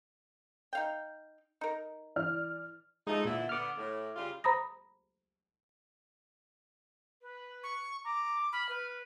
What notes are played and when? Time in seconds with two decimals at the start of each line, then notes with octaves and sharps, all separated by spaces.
0.73 D#4 F5 G5
1.61 D#4 A#4
2.16 E3 D5 F6
3.07 F3 G#3 A3 D#4
3.25 A#2 D3 E3 E4
3.49 D3 B3 D6 F6
3.78 A2
4.16 C#3 G3 F4
4.44 C5 A#5 B5 D#6 A#6
7.22 B4
7.63 C#6
8.05 A#5 D6
8.52 B5 F6
8.69 B4